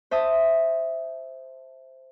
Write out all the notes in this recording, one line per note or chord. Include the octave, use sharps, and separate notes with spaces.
C5 E5 A5 D#6